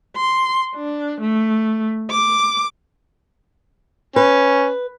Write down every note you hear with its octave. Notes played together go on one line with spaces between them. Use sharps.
C6
D4
A3
D6
C#4 B4